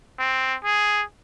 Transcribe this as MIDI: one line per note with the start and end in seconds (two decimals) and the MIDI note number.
0.19 0.56 60
0.65 1.03 68